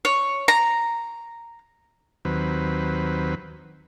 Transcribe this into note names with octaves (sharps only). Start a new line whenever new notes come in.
C#5
A#5
D#2 F#3 C4 B4